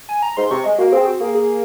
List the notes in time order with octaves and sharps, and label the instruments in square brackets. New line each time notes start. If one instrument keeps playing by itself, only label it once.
[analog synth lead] G#5
A#5
[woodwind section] G#2 [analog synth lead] C6
[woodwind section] C3 [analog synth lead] C#6
[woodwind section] G#3 [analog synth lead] D#5
[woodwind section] A#3 [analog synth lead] F#4
[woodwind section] C4 [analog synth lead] G#4
[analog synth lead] F#4
[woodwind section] A#3 [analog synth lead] G#4
[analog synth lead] G#4